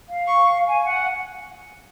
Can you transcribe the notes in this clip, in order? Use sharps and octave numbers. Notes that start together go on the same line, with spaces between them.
F5
C#6
G#5
F#5